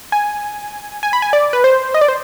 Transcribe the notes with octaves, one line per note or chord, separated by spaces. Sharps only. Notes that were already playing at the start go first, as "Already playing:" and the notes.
G#5
G#5
B5
G#5
D5
B4
C5
D#5
D5
C5